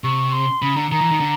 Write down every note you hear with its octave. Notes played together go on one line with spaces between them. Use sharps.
C3 C#6
C6
C#3 B5
D3 A#5
D#3 A#5
E3
D#3
D3